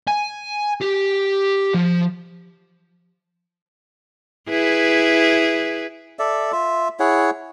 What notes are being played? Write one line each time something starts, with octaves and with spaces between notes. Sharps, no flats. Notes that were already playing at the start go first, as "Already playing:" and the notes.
G#5
G4
F3
E4 G#4 B4
A4 D5 E5
F4 E5
E4 G#4 C#5 F#5